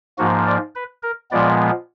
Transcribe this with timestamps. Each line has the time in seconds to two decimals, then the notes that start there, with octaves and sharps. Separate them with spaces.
0.18 G#2 F3 A#3 F#4
0.47 D5
0.75 B4
1.03 A#4
1.31 A#2 F3 G#3 B3 D5